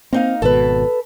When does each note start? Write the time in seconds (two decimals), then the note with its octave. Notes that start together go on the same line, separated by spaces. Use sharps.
0.13 A#3 C4 D#4 F5
0.42 G#1 B2 A4 B4